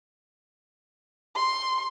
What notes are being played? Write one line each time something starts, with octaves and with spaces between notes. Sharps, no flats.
C6